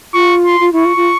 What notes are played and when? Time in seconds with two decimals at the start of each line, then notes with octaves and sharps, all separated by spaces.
0.14 F4 C#6
0.45 C6
0.60 F4
0.73 E4 C#6
0.85 F4
0.97 F4